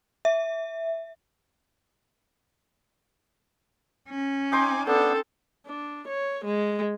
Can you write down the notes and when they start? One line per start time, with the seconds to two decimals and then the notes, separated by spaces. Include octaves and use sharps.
0.25 E5
4.10 C#4
4.52 D#4 G5 G#5 C6 D6
4.87 B3 D4 A4 G5
5.66 D4
6.08 C#5
6.45 G#3